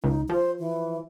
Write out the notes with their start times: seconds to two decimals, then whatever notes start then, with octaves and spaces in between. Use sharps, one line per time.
0.04 C#2 D#4
0.29 F3 C5
0.59 E3